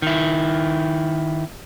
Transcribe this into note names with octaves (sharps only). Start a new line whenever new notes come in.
D#3 E4